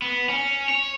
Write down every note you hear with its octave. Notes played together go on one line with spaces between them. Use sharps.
B3
C#4
C#5